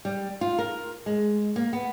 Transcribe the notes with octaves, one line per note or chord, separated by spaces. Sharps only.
G3
F4
A#4
G#3
A#3
B3